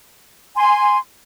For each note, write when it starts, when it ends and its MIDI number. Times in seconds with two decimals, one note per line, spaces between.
0.56 0.98 80
0.56 0.98 84